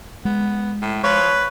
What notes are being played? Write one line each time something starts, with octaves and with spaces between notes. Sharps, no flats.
G#3 B3
A2
F3 B4 C#5